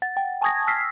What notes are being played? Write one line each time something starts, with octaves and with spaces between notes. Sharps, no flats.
F#5 A6
G5
G#5 A5 C#6 D#6 G#6 A#6
E6 F6 B6 C7